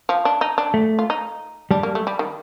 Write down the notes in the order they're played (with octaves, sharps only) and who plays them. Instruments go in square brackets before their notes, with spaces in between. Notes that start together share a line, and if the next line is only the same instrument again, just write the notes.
[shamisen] F3
D4
D#4
D4
[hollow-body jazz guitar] A3
[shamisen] F4
D#4
[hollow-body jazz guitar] G3 [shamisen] D4
[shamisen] A#3
A3
G3
D#3